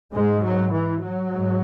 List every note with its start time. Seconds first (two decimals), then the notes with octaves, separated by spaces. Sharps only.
0.14 G#2 G#3
0.43 F#3
0.72 E3
1.02 F#3
1.31 G#2